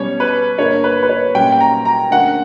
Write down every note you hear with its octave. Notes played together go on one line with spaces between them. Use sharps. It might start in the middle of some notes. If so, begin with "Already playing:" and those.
Already playing: B2 G3 C#4 C#5
B4
G2 D3 A#3 C#5
B4
B4
C#5
A#2 G3 C#4 G5
G5
A#5
A#5
D2 D3 A#3 C#4 F#5